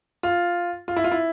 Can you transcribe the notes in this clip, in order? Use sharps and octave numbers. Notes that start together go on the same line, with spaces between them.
F4
F4
E4
F4
E4